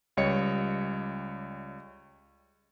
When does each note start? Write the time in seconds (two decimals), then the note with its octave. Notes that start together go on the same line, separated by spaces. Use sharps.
0.17 C#2 G3 C#5 D#5 C#7